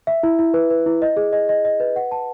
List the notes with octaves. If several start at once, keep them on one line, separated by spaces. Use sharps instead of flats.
E5
E4
E4
B4
B4
E4
D#5
G#4
D#5
D#5
D#5
B4
F#5
A5